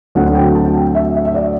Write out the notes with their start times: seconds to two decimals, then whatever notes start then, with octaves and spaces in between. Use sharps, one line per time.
0.15 D2 D3 F#3 C4 F#5
0.35 G5
0.55 A5
0.75 G5
0.95 E5
1.15 E5
1.25 E5
1.34 D5